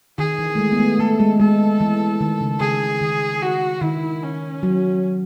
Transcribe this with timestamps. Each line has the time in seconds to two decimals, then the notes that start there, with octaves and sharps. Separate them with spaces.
0.18 D#3 G#4
0.39 E3
0.55 A3
0.59 G#3
0.72 B3
0.79 A3
0.99 A3 A4
1.20 G#3
1.40 G#3 A4
1.80 E3
2.21 D#3
2.41 C#3
2.60 C#3 G#4
3.01 D#3
3.42 F#4
3.82 D#3 E4
4.22 C#4
4.63 F#3